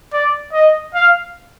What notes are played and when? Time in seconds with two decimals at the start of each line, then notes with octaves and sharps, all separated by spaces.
0.13 D5
0.53 D#5
0.95 F5